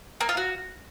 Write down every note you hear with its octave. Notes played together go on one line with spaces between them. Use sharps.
A#3
F4
F#4